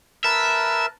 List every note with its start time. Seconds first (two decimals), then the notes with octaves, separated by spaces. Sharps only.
0.24 A#4 B4 E5 A5